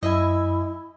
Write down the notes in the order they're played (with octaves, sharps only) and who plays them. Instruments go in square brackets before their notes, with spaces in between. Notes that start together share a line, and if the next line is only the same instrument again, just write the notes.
[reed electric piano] F#2 [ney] E4 [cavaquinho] D#5 E5 G#5